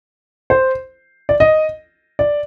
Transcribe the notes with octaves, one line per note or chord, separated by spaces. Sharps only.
C5
D5
D#5
D5